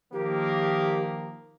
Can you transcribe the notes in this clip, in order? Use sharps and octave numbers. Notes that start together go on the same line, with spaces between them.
D#3 F3 A#3 G4